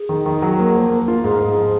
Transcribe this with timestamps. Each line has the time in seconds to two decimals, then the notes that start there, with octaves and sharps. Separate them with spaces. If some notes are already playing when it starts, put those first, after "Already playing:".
Already playing: G#4
0.09 D#3
0.26 D#3
0.42 F#3
0.59 A#3 A#4
0.75 F3
0.91 A#3
1.08 F4
1.24 G#2 G#4
1.41 G#2
1.57 F3